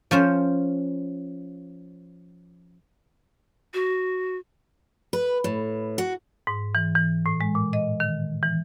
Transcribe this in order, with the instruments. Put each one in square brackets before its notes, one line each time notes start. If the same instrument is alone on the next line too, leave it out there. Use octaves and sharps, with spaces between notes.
[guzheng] F3 C#4 C5
[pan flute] F#4
[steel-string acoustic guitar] B4
A2
F#4
[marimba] G#2
E3
E3
A2
G#3
A#2
D#5
D#3
E3